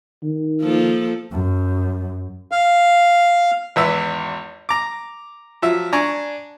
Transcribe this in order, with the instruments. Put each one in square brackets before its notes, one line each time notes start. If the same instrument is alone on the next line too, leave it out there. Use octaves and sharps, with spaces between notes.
[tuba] D#3
[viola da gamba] F3 A#3 A4
[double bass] F#2
[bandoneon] F5
[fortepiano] G#1 E2 B4 E5 E6
A#5 D6
F3 F#3 E5
D4 G#5 A#5 C#6